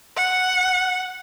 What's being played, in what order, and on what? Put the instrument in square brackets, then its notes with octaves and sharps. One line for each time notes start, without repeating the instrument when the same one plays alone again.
[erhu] F#5